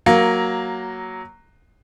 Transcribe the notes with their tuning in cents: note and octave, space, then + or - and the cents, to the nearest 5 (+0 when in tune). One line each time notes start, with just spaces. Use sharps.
F#3 +5 A#3 +0